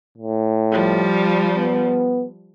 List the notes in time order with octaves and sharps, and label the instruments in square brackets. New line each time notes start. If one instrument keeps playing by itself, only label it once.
[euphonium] A2
[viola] F3 G3
[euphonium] B3